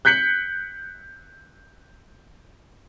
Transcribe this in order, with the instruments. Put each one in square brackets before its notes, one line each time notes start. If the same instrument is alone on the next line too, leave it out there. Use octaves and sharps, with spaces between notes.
[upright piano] F#6 G6 B6 C#7 F#7